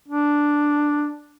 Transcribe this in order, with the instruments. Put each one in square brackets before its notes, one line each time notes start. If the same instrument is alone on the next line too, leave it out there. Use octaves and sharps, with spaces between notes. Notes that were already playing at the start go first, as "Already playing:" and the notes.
[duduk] D4